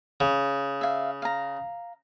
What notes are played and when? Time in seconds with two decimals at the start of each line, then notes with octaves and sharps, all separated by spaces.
0.20 C#3
0.81 E5 F5
1.22 F5 A#5